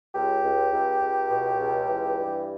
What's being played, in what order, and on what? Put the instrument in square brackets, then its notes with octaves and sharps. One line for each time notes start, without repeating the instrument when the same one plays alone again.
[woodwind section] C#2 G4
C#2
C#2
C#2
B2
C#2
E3
G2